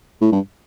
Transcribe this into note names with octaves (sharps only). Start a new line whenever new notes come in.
A2
G2